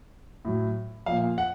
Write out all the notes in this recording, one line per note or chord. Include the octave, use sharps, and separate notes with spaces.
A2 F#3
A#2 F3 F5
F#5